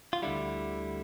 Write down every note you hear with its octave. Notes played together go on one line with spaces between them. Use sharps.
F4
D2 D3 G3 E4